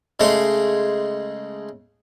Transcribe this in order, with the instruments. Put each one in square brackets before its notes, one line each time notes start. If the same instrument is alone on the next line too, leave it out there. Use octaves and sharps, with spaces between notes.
[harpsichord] C#3 G#3 A3 C#5 C6